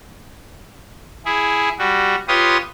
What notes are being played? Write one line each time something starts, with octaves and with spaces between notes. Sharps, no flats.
E4 G#4
G3 F#4
F4 G4 B4 C#5 C6 D#6